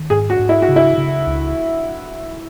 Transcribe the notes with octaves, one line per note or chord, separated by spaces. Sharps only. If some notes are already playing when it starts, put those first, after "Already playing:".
Already playing: D#3
G#2 G#4
F#4
G#2
E4
F#4
C#3
E4
C#3
C#2